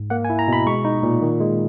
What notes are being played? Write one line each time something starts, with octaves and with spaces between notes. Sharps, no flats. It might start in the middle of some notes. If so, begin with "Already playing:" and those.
Already playing: G#2
A#3 F#5
G#5
E4
A#5
B2 B5
G#3 C#6
D#4
A#2
D#3
G#3